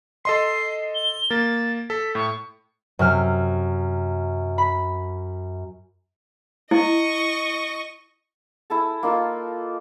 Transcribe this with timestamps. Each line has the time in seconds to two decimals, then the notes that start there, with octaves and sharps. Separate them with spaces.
0.25 A4 D#5 C6 C7
0.95 G7
1.30 A#3 A#4 A6
1.90 A4 B6
2.15 A2 C#6
2.99 F#2 C3 F6
4.58 B5
6.71 E4 D#5 C#6
8.70 E4 G#4 A4 A5
9.03 A#3 D#4 F4 A4